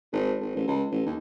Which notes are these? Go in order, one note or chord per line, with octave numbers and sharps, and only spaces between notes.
G#1
G#1
A1
C#2
A1
D#2